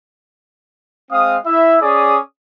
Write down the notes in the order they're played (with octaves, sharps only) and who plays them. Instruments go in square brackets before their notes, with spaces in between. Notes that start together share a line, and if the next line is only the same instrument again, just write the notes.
[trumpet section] G#3 C4 F5 D#6
E4 E5
C#4 G#4 D5 D6 D#6